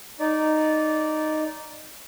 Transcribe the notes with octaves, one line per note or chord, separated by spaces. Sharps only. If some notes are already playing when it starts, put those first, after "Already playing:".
D#4 D5